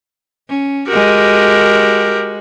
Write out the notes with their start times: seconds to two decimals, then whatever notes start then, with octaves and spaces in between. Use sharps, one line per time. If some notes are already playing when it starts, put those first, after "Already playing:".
0.49 C#4
0.88 G#3 F#4 G4 A#4